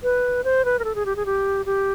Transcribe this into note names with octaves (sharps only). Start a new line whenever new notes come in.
B4
C5
B4
A#4
A4
G#4
G4
G#4
G4
G4